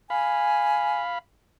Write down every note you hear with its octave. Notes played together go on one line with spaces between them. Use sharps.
F5 G#5 B5